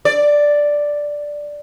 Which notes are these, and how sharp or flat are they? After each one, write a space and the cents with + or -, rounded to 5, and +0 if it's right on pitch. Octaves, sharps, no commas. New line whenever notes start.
D5 +0